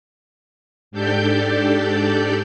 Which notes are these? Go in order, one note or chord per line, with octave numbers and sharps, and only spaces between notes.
G#2 D4 G4 A4 D5 G6